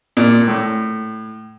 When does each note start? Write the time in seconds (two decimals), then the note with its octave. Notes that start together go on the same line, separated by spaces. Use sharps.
0.17 A#2
0.47 A2